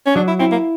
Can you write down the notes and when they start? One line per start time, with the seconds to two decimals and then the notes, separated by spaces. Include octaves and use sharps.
0.06 C#4
0.16 F#3 D4
0.28 E4
0.39 C4 E4
0.52 A#3